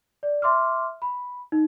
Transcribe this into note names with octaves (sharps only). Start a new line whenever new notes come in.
D5
E5 C6 D6 F6
B5
D#4